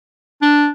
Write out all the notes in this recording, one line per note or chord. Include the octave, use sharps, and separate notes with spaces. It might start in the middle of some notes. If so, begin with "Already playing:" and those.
D4